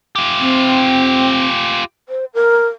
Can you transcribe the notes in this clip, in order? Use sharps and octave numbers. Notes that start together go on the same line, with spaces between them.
F4 G4
C4
C5
A#4